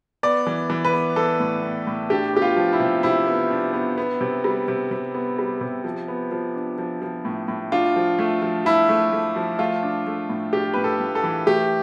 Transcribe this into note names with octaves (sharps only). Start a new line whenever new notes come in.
B3 D5
E3
E3
B4
B3
E3 A4
A2
A2
A2
D4 G4
B3 G4
F4
F3
E4
C3
C3 E4
B3
D4
B3
B3
C3
G3
C3
C3
B3
G3
C3
F3
B3
F3
D4
F3
F3
A2
A2
D4 F4
F3
A3
F3
F3 E4
A3
A3
F3
A3 F4
D4
A3
A2
D4 G4
A2 B4
A4
A2
A4
E3
A3 G4